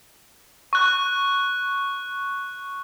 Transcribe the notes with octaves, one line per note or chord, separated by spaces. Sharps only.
C#6 F#6